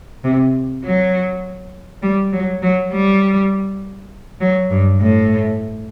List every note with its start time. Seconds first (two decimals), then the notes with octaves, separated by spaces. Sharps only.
0.24 C3
0.84 F#3
2.03 G3
2.33 F#3
2.62 F#3
2.92 G3
4.41 F#3
4.71 G2
5.01 A2